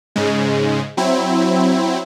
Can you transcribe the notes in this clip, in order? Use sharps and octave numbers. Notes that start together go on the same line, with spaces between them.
G#2 C#3 G#3
F#3 C4 E4